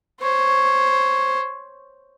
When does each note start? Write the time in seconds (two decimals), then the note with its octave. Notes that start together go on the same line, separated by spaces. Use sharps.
0.21 C5 C#5